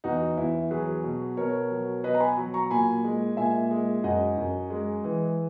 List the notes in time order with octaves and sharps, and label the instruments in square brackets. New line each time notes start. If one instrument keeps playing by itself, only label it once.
[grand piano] E2 D#4 F#4
E2 E4
F#3 G#4 B4
B2
B2 A#4 C#5
F#3
B2 B4 D#5
A#5
G#5 B5
F#3
A#5 C#6
A#2 G#5 B5
G#3
A#2 E5 G#5
G#3
F#2 D#5 F#5
F#2
G#3
E3